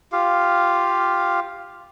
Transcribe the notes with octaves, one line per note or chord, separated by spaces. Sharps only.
F4 G4 F5